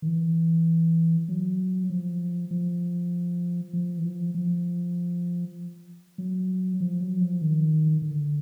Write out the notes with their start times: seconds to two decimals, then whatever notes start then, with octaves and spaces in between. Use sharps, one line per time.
0.02 D#3
0.06 E3
1.29 F#3
1.90 F3
2.51 F3
3.73 F3
3.98 E3
4.05 F3
4.35 F3
6.18 F#3
6.80 F3
7.01 F#3
7.20 F3
7.42 D#3
8.02 D3